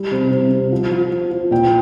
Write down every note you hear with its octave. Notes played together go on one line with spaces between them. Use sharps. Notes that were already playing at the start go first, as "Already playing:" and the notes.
Already playing: G3
C3
C3
C3
F3
F3
F3
F3
A#2 G5